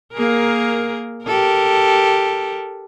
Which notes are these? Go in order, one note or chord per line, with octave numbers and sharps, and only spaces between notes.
A#3 G#4 A#4
G4 A4 A#4